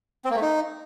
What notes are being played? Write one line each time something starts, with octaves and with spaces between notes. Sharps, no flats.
C4
A#3
A3
D#4